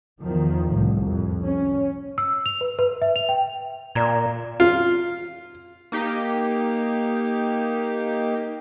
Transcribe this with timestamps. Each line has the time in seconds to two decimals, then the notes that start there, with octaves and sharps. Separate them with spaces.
0.19 E2 D#3 F3
0.71 C2 A2
1.07 F2
1.43 C#4
2.18 E6
2.46 F7
2.61 B4
2.79 B4
3.02 E5
3.16 F7
3.29 G5
3.95 A#2 D5 A#5 G#6
4.60 F4
5.92 A#3 D#4 G4